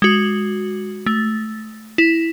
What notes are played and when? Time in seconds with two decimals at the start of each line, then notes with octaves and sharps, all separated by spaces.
0.02 G#3 F#4
1.06 A3
1.98 E4